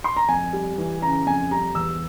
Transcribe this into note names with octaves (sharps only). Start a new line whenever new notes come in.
C6
A#5
F2 G#5
G3
E3
C#3 A#5
F2 G#5
G3 A#5
E2 E6